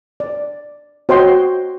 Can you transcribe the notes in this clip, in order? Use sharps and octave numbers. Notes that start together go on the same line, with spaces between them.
D5
F#4 C5 C#5 D#5 G5 C6